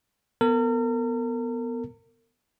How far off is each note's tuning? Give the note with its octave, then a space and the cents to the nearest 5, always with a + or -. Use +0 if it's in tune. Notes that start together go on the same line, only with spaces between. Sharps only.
B3 +0 A#4 -40